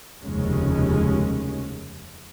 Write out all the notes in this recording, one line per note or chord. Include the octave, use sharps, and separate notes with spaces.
F1 D#2 C#3 G#3 C#4